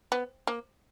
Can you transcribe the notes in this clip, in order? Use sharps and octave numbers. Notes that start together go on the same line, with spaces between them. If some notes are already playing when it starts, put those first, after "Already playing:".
B3
A#3